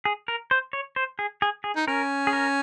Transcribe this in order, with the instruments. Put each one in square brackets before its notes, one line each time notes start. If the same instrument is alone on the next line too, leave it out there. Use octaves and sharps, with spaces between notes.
[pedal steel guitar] G#4
A#4
C5
C#5
C5
G#4
G#4
G#4
[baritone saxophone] D#4
[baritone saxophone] C#4 [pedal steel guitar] A#4
[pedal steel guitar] G#4
A#4